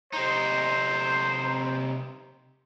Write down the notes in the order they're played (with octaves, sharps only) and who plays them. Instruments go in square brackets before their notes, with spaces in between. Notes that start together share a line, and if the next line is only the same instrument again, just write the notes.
[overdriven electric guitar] C3 D#4 [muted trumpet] C5